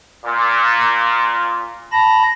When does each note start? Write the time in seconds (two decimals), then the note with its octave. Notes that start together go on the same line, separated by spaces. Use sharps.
0.24 A#2
1.92 A5 B5 A#6